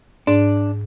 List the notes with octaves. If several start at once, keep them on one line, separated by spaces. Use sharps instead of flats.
G#2 D4